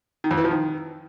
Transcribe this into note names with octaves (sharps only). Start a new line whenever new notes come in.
D#3
F2
E3
F3
D#3